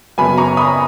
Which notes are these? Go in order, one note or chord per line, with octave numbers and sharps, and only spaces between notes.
F#2 C#3 F#3 B3 G#5 B5
A#5 C#6
B5 D#6